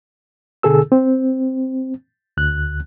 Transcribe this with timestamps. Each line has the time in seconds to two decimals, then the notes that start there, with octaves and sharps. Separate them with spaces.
0.63 B2 D3 G#4 A4 E6
0.92 C4
2.37 D2 F#6